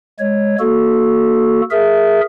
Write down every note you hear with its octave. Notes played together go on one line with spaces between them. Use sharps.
G#3 C#5
A#3 F#4 A4
G#4 A#4 E5